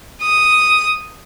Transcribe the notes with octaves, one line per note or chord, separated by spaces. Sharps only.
D#6